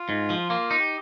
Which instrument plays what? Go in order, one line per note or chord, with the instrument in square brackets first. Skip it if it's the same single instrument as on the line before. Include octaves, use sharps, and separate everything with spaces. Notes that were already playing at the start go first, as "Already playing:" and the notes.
Already playing: [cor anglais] F4
[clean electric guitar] G#2
F3
[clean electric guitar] A#3 [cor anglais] F4
[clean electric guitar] D#4
[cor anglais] G4